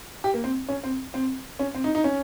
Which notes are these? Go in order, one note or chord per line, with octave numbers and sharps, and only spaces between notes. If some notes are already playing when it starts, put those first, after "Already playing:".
G4
A#3
C4
C#4
C4
C4
C#4
C4
D#4
D#4
C#4